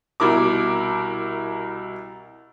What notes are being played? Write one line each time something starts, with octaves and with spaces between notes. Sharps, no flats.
C2 B2 E4 A#4 D6